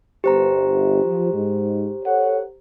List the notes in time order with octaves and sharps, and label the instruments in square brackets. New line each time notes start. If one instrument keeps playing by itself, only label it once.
[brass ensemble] G1 [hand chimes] G4 C5 A#5
[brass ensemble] F3
G#2
A4 C#5 F#5